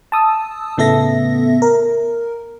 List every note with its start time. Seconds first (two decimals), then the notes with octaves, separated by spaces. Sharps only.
0.12 A5 D#6 E6
0.78 A2 C#3 B3 A4 E5 A#6
1.62 A#4